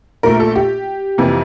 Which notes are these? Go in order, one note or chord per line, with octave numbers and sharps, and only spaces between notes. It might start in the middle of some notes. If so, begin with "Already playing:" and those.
A#1 A#2 A3 A#4
A4
G4
F2 C3 E3 A#3